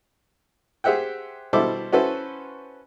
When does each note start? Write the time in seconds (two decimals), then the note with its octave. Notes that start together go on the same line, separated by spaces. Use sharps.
0.84 G4 G#4 C5 E5 F#5 G5
1.53 B2 G3 E4 A4 C5 D6
1.93 C#4 E4 F#4 A4 B4 C5